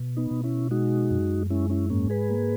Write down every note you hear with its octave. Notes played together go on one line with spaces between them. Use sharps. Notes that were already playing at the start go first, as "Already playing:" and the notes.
Already playing: B2
B3 D#4
B2
C#4 E4
G#3 D#4 F#4
F#2
G#3 C#4 E4
C#4 E4
G#2 A#3 C#4
G#4 B4
A#3